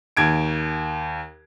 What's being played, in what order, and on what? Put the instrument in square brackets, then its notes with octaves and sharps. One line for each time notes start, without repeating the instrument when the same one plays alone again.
[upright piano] D#2 G#6 D7